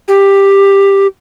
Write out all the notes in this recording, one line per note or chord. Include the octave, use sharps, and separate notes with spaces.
G4